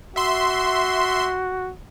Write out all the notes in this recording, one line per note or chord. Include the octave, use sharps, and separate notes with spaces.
F#4 E5 C6